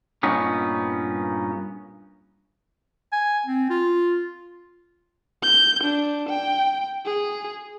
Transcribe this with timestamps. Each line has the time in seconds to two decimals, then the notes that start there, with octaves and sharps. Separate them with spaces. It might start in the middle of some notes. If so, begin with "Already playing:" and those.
0.23 G2 A#2 B3 C#4 D#4
3.12 G#5
3.46 C4
3.70 F4
5.43 G6
5.84 D4
6.30 G5
7.06 G#4